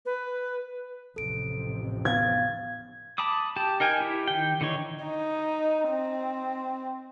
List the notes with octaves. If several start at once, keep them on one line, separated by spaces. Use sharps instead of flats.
B4
A1 F2 C3 A4 D7
B3 F5 G#6 A6
A5 B5 D6 D#6
G4 A5
D#4 A#4 G5 G#5
E4 G4
D#3 G5
D3 E3 D#4 C#5
D#4
C4